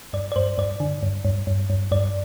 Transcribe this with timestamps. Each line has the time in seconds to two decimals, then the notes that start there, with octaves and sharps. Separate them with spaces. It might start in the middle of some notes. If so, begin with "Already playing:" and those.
0.13 G2 D5
0.32 D5
0.36 G2 C5
0.58 G2 D5
0.80 D3
1.03 G2
1.25 G2
1.47 G2
1.70 G2
1.91 G2 D5